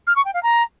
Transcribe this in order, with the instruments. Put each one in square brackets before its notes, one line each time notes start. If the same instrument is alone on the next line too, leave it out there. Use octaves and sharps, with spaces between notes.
[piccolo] F6
C#6
G5
F5
A#5